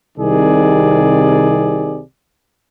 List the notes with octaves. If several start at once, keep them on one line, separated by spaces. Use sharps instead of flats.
C2 C3 D#3 G#4 D5